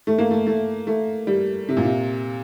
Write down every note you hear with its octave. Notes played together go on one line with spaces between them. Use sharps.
A3
A#3
A3
A3
A3
G3
C3
A#2
C3